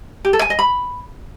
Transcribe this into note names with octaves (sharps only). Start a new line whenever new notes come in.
G4
A4
G#5
D#5
B5